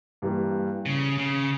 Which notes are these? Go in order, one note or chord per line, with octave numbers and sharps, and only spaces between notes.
G2 E3 G3 A#3
C#3
C#3